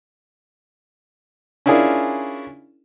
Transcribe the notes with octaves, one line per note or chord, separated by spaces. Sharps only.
C#4 D4 E4 F4 G#4 A#4